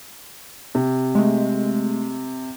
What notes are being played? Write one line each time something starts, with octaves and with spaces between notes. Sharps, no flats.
C3
G#3 A3